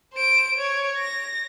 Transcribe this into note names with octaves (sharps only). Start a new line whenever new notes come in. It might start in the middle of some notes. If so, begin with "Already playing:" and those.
C5 D7
C#5
A#6